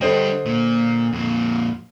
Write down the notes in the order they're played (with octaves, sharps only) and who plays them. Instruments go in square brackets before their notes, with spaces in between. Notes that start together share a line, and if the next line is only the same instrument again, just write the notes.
[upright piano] D3 C5 D#5 [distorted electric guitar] G3 D4
[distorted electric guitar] A#2
F2 A#2